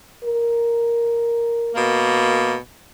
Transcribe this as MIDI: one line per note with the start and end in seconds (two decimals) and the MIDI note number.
0.24 2.07 70
1.74 2.55 47
1.74 2.55 58